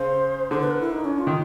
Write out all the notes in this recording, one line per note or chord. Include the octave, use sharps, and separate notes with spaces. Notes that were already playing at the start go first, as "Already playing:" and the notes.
Already playing: C#3 C5
D3 C5
B4
A#4
E4
D#4
C#4
F4
D#3